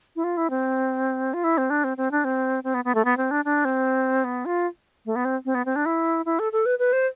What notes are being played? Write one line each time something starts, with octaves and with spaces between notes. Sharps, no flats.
E4
F4
E4
C4
F4
E4
C4
D4
C4
C4
D4
C4
C4
B3
B3
A3
B3
C4
D4
D4
C4
B3
F4
A3
B3
C4
C4
B3
C4
D4
E4
E4
A4
A4
B4
B4
C5